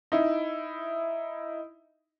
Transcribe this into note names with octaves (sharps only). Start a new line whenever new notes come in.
D#4 E4